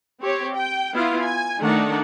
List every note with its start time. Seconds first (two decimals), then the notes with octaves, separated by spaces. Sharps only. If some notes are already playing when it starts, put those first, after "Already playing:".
0.21 C4 G4 C#5
0.55 G5
0.93 B3 E4 F4 F5
1.22 G#5
1.61 D#3 A3 D4 D#4 F#5